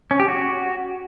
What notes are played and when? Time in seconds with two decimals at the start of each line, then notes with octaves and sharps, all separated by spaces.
0.11 C#4
0.20 G4
0.28 F#4